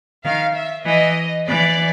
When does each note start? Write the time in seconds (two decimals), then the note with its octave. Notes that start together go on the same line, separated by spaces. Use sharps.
0.25 D#3 F5
0.56 E5
0.86 E3 D#5
1.48 E3 D5